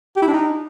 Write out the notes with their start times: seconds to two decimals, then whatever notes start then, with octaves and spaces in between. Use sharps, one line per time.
0.16 G4
0.22 E4
0.28 D4
0.33 D#4